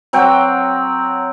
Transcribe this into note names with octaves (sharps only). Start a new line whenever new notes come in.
F#3 C4 F#5 G5